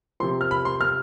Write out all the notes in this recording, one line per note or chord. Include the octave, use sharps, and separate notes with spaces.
C3 F3 C6
F6
B5
C6
F6